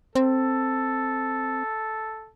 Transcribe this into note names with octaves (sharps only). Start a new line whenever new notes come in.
C4 A4